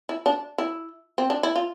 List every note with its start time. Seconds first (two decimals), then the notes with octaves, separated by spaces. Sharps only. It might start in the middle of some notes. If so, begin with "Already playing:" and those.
0.09 E4
0.26 D4
0.58 E4
1.18 C4
1.30 D4
1.43 E4
1.56 F4